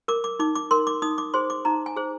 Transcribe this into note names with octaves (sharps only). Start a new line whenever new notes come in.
A#4 D6
D6
D#4 D6
D6
A#4 C6
D6
D#4 D#6
D6
G#4 C5 C6
D6
D#4 A#5
G#5
G#4 C5